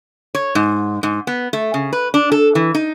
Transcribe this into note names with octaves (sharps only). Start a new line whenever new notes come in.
C#5
G#2
G#2
B3
A3
C#3
B4
D4
A4
E3
D#4